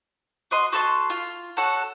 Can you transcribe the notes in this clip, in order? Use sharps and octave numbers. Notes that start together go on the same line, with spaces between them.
F#4 D#5 C6
F#4 A4 A5 C6
F4
F#4 A4 C#5 F#5